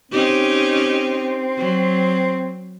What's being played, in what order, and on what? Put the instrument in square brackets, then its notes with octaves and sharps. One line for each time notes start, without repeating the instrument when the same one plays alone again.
[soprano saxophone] C4 [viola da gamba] C#4 D#4 G4
[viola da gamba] F#3